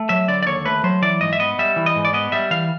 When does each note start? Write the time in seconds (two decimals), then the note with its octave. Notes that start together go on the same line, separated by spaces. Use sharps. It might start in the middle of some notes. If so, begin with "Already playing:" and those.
Already playing: A3
0.09 F#3 E5
0.28 D3 D5
0.43 D5
0.46 D#2 C#5
0.66 A3 B4
0.84 F#3 C5
1.02 E3 D5
1.21 G#2 D#5
1.33 E5
1.39 B3 D#5
1.59 G3 E5
1.76 E3
1.86 D#5
1.96 G#2
2.05 D5
2.14 B3 D#5
2.32 G3 E5
2.51 E3 F5